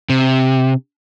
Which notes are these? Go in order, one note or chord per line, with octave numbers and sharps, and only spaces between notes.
C3